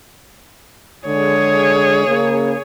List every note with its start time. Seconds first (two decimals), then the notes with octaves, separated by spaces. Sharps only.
1.07 D3 G#3 G#4 C#5
2.07 C#3 A#3